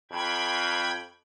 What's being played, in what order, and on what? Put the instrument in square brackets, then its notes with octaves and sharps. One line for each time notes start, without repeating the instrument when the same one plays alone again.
[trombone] F2 [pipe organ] G5 B5 G#6